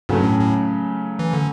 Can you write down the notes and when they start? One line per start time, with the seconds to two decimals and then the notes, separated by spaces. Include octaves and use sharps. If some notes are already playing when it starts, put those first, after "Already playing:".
0.09 G2 C#3 F#3 A3 C#4
0.24 A2
0.39 A2
1.19 E3
1.33 D3